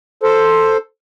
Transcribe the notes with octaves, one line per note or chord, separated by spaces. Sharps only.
A4 C5